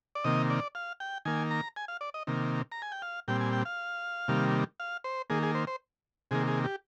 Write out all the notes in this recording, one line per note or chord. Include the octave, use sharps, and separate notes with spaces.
D5
C3 D#3 A#3 D#5
D5
F5
G5
D#3 A#3 G#5
A#5
G#5
F5
D5
D#5
C3 D#3 A#3
A#5
G#5
G5
F5
A#2 G3 C4 G5
G#5
G5
F5
C3 D#3 G3 A#3
F5
C5
D#3 A#3 G#4
G#4
C5
C5
C3 D#3 A#3 G#4
G#4
G4